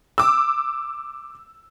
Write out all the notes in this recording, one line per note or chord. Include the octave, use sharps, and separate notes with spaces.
D6 E6